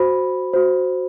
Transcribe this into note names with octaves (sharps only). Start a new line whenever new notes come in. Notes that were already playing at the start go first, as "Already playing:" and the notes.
Already playing: F#4 C5 B5
F#4 C5